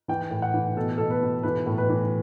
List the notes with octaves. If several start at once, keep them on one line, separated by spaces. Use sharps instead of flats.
E3 G5
A2
F#5
E3
B2 A4
B2 A4
B4
B2
E3 B4
A2
B4
E3